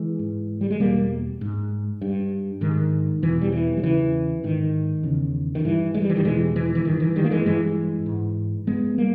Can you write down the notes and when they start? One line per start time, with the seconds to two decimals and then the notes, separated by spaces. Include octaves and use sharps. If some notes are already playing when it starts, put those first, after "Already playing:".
Already playing: E3 G#3
0.19 G#2
0.61 G3
0.70 G#3
0.80 E2 B2 G3 A#3
1.41 G#2
2.01 G2
2.61 G#2 D#3
3.22 E2 B2 E3
3.41 G3
3.52 E3
3.77 G3
3.83 E2 C#3 E3
4.44 G#2 D#3
5.03 E2 C#3
5.55 D#3
5.65 G2 E3
5.94 G#3
6.02 G3
6.10 E3
6.16 D#3 G3
6.25 E2 B2 E3 G#3
6.56 E3
6.75 E3
6.85 G2 D#3
7.00 E3
7.16 D#3 G3
7.24 A#3
7.31 E3 G#3
7.46 G2 E3 G#3
8.06 G#2
8.67 G2 G#3 B3
8.98 G3 A#3